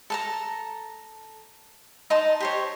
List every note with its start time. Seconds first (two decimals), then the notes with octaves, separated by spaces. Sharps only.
0.10 A4 A5 A#5
2.10 D#4 D#5 A5 C6
2.40 G4 C5 C#5